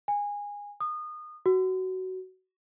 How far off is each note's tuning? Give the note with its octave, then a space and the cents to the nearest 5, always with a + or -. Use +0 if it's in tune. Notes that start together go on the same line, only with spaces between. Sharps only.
G#5 -20
D#6 -25
F#4 +15